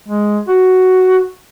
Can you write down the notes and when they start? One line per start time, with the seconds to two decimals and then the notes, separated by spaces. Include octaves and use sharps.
0.08 G#3
0.48 F#4